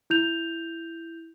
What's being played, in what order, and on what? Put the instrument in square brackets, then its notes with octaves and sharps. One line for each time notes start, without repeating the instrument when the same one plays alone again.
[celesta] E4 G6 F7